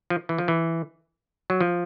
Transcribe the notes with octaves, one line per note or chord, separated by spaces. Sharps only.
F3
E3
F3
E3
F#3
F3